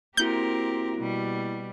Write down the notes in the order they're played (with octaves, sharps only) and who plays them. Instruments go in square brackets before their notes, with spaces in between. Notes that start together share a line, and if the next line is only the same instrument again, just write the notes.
[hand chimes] A#3 E4 F#4 [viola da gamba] C4 G4 A#4 [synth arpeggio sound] G6
[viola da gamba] B2 G3